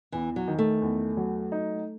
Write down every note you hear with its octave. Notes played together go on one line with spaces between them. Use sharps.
E2 E3
F#3
D#3
A3
E2
F#3
D#4